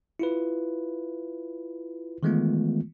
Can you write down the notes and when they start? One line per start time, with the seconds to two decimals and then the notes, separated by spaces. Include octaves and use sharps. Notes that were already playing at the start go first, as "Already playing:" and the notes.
0.19 E4 F4 B4
2.23 D#3 E3 G#3 A3 B3 F4